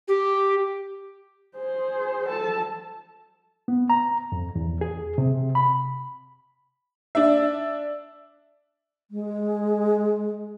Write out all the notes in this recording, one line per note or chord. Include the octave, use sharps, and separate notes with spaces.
G4
G#4 C5
A4 A5
B3
A#5
F2
E2
G#4
C3
B5
D4 E5
G#3